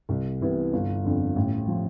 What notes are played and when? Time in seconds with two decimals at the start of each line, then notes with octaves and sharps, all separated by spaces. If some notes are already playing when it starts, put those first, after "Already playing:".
0.09 C2
0.41 C3 E3 B3 E4
0.73 G1
1.05 F2 D3
1.36 A1
1.68 F3